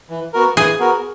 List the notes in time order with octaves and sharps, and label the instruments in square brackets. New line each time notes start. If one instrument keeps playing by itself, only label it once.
[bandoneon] E3
B3 F#4 A#4
[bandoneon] E3 [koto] G#4
[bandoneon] B3 F#4 A#4